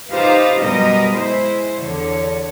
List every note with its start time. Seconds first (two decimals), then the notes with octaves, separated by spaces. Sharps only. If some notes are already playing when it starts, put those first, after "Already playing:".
0.11 D#4 F4 G4 B4 C5 F5
0.62 F#2 B2 G3 A#4 B4 D#5
1.14 G#3 E4 C5
1.80 E2 D3 C#5